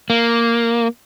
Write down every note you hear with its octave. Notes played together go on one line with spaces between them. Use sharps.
A#3